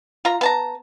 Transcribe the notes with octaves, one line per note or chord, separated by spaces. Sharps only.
F4 A#5
B3 A5 A#5